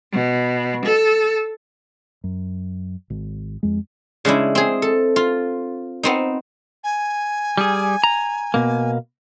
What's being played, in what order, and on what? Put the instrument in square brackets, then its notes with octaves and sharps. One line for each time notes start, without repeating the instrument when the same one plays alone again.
[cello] B2
A4
[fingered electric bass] F#2
G#1
F2 G#3
[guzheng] C#3 G#3 D4 E4
C4 G#4
A4
F4
B3 C4 D#4
[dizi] G#5
[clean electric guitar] G3 G#4
A#5
B2 A#3